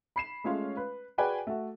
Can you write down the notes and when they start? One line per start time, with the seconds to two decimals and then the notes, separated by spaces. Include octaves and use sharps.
0.16 B5 C7 E7
0.44 G#3 A3 C#4 F4 C#5 F5
0.77 B4
1.18 F#4 G#4 B4 D5 G5 G#5
1.47 A3 F#4